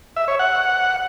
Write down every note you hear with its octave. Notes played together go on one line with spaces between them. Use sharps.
E5
C#5
F#5